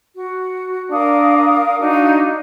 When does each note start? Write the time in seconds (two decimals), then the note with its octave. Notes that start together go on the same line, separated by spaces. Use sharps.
0.15 F#4
0.92 D4 A#4 F5 D#6
1.80 D4 D#4 F#4 F5